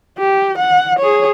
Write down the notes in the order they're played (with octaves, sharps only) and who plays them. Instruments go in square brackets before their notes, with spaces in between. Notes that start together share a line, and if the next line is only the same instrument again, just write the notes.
[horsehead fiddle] G4
F#5
G#4 C#5